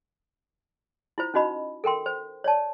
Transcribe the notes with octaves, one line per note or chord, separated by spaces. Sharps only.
E4 F4 C5
C#4 D#4 F#4 D#5 B5
A4 A#4 G5 C6
C5
C#5 D5 A5